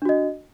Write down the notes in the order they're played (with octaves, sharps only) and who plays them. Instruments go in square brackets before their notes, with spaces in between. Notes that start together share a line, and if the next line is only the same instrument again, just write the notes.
[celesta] D4
F#4
D#5